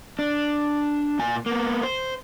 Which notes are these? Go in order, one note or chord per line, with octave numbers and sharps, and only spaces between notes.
D4
A#2 G#5
A#3 B3
C5